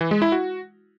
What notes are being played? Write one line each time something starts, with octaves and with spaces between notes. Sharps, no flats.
E3
G#3
E4
F#4